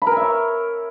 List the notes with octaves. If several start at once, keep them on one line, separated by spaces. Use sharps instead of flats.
B5
A#4
G#5
E5
C#5